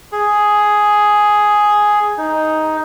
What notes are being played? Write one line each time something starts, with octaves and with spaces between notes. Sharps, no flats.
G#4
D#4